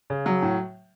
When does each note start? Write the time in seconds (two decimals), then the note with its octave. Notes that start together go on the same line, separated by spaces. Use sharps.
0.10 C#3
0.26 F#3
0.42 A2